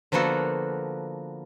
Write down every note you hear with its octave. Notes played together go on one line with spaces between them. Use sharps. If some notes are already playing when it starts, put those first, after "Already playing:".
D3 F3 A#3 B3 F#4 A4